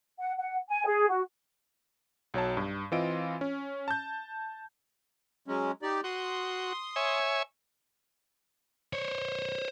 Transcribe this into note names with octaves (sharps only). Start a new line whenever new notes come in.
F#5
F#5
G#5
G#4
F#4
B1 F#3 C#5 A5
G2
E3 C4 F4 D#5 D7
C#4
A5 G6
F#3 G#3 C#4
D#4 G4 D5
F#4 C6 D#6
C#5 E5 G#5
C5 C#5